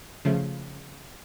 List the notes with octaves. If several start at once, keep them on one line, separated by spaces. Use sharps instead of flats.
C#3 F3 A3